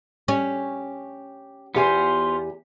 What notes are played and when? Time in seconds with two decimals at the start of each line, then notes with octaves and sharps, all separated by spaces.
0.28 C#4 G4
1.75 E2 B3 F4 G4 C5 G#5